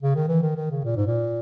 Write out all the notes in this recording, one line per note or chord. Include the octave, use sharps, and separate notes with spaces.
C#3
D#3
E3
D#3
D#3
C#3
A#2
G#2
A#2